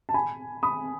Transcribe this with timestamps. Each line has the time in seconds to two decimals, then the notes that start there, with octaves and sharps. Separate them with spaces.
0.09 A5
0.14 G#5 B5
0.63 B5 D#6